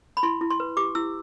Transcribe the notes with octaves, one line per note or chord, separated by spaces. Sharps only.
B5
E4 C6
E4
C6
B4
G4 D6
E4 E6